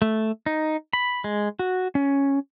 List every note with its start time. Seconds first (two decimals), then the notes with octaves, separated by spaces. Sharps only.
0.02 A3
0.46 D#4
0.93 B5
1.24 G#3
1.59 F#4
1.95 C#4